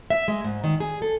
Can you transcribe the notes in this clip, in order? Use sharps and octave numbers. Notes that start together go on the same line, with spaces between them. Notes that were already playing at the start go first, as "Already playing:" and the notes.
E5
G#3
G#2
D#3
G#4
A4